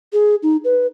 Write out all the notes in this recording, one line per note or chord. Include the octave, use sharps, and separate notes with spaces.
G#4
D#4
B4